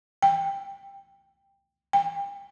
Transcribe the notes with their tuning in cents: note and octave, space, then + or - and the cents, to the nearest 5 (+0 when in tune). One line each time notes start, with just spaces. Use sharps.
G5 +15
G5 +35